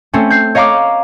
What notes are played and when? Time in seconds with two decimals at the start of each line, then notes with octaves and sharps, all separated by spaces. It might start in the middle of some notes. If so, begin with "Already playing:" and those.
0.13 A3 C4 C#4
0.30 G6 C7
0.55 C#5 D#5 F5 A#5 D6